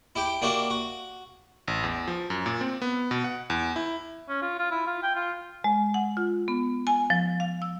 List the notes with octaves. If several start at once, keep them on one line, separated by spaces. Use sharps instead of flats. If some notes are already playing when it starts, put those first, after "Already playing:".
E4 G4 G5
A#3 D4 E4 F#4 G4
F#4
A1
E2
F3
F#2
A#2
C4
B3
B2
F#5
E2
E4
C#4
F4
F4
E4
F4
G5
F4
G#3
F#5
F4
B3
G#5
F3
F5
E6